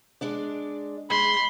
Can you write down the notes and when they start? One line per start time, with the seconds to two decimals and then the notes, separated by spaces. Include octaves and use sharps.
0.21 G#3 D4 D5
1.10 G#3 B5 C6